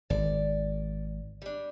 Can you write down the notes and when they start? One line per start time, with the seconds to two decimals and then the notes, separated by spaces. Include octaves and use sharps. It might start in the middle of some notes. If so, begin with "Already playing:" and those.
0.10 G#1 D5
1.42 G3 D4